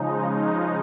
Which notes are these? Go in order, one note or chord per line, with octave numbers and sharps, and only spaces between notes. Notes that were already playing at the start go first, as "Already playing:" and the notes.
Already playing: C#3 F3 G#3 D#4
D#4